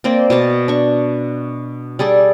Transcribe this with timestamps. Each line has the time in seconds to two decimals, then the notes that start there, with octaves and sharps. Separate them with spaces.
0.04 A#3 C4 C5 D5
0.30 B2 F5 A5
0.68 D4 C#6
1.99 G3 G#4 A4 D5